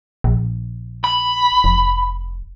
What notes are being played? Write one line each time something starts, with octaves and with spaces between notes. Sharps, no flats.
A#1
B5
F1